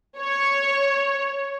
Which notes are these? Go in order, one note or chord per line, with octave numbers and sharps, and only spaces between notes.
C#5